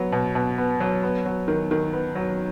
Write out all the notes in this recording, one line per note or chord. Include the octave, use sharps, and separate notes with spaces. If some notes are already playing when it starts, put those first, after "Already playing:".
Already playing: F#3 B3
B2
B2
B3
F#3
B3
F#3
D#3
D#3
B3
F#3